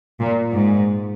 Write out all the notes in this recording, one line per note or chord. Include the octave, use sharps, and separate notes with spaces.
A#2
G#2